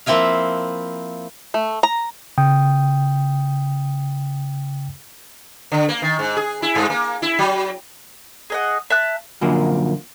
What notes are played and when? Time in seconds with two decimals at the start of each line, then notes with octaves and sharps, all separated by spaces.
0.06 F3 A#3 C4 E4 E5 F5
1.54 A3
1.83 A#5
2.38 C#3 G5 D#6
5.72 D3
5.89 A#3
6.02 D#3
6.19 G#2
6.37 G#4
6.62 E4
6.75 G2
6.90 A#3
7.22 E4
7.39 F#3
8.50 G#4 D#5 F#5
8.90 E5 A5 F#6
9.41 F#2 A#2 D3 F3 A#3